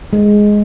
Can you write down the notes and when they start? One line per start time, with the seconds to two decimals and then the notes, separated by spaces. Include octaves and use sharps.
0.13 G#3